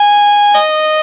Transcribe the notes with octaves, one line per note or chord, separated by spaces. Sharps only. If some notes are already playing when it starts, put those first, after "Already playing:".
Already playing: G#5
D#5